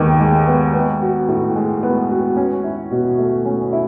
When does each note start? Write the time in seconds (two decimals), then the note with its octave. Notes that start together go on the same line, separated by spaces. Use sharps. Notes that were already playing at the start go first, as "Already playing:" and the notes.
Already playing: D#2 D#3 G#3 B3
0.20 G#3
0.47 B3
0.74 B3
1.01 F#4
1.28 A2
1.56 G#3
1.83 B3
2.09 F#4
2.37 C#4
2.64 E4
2.91 B2
3.19 A3
3.45 C#4
3.73 E4